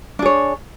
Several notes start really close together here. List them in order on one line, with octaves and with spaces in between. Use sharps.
D4 G#4 C#5